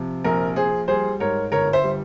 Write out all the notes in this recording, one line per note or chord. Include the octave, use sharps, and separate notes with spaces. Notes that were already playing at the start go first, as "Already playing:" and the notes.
Already playing: C3 F3
A#1 A#4
A#1 G#4 C5
G3 G#4 C5
G#2 A#4 C#5
G1 A#4 C#5
C5 E5
G3